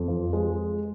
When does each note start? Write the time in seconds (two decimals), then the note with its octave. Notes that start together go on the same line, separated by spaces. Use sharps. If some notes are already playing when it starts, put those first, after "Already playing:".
Already playing: F2
0.08 F3
0.33 G#3